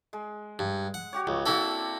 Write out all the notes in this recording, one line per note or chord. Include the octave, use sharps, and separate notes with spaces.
G#3
G2
F#5
F#4 G4 C#5
C#2
A#3 C4 D4 E4 F#4 A4